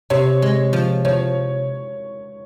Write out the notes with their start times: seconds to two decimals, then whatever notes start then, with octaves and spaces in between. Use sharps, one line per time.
0.10 C3 C#5
0.42 G#3
0.73 F3
1.05 F3 C#5